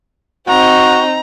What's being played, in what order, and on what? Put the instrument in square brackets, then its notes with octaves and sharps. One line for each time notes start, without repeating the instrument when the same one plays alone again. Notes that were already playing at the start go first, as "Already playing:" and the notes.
[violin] C4 D#4 [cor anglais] F#4 [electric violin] A#5